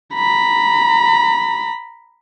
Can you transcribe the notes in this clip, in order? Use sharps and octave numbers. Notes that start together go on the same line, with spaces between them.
A#5 B5